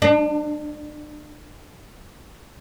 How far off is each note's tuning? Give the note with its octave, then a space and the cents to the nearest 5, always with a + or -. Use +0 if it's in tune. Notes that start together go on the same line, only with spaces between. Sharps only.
D4 +35